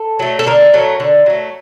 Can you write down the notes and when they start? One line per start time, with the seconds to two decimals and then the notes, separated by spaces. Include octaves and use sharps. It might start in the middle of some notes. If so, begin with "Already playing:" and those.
Already playing: A4
0.19 F#3 A3
0.39 A4
0.46 D3 A#4
0.73 F#3 A3
1.00 D3
1.26 F#3 A3